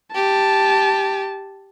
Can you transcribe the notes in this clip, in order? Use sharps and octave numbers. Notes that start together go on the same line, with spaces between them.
G4 A5